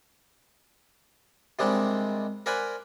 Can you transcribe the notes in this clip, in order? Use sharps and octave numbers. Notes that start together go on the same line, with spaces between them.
C3 D#3 G3 G#3 C4 D4
A#4 C5 D5 F#5 G#5 B5